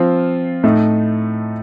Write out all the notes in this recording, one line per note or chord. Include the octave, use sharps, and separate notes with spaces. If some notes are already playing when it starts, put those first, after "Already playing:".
Already playing: F3 C4 F4
A2 A3 D#4